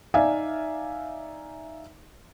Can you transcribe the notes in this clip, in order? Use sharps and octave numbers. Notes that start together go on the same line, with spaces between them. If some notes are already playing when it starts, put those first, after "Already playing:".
D#4 D5 E5 F5 G#5